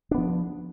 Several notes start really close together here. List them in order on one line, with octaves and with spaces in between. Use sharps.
D4 B3 F3